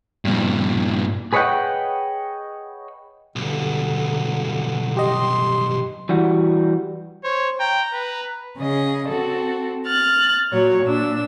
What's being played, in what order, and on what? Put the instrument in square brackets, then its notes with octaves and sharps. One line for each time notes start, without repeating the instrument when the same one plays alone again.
[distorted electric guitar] G2 A#2
[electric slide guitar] G#4 B4 C#5 D#5 F#5 G5
[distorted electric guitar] B1 G2 [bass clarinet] D3
[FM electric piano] G4 D#5 [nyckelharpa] C6
[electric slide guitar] E3 G3 F#4
[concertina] C5 [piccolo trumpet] C#5
[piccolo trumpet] G5 [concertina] A#5
[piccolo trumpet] B4
[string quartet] C#3 G#4 D#5
C4 F#4 A4
F6 F#6 A6
A#2 F#3 C#5
A#2 D4 E6